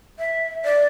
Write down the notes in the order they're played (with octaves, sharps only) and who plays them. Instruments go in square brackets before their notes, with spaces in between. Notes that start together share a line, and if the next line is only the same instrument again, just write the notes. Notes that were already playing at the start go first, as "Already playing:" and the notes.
[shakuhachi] E5
D5